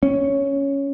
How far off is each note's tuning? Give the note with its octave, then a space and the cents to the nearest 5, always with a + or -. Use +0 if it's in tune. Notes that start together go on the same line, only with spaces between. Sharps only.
C#4 +0